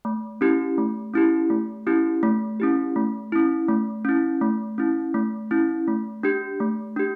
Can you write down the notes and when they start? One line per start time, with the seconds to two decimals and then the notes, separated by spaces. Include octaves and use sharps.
0.05 A3
0.41 C#4 E4 G4
0.78 A3
1.14 C#4 E4 G4
1.50 A3
1.87 C#4 E4 G4
2.23 A3
2.60 C#4 E4 G4
2.96 A3
3.32 C#4 E4
3.68 A3
4.05 C#4 E4
4.42 A3
4.78 C#4 E4
5.14 A3
5.51 C#4 E4
5.87 A3
6.23 D4 G4
6.60 A3
6.96 D4 G4